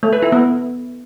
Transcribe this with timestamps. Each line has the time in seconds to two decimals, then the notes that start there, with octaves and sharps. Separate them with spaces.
0.03 A3
0.13 B4
0.22 E4
0.32 B3